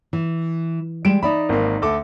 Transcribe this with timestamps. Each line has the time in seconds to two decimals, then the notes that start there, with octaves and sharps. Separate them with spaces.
0.13 E3
1.05 G3 G#3 D7 E7
1.23 D#4 D5 E5 B5
1.49 G#1 A#3
1.82 D2 A4 D6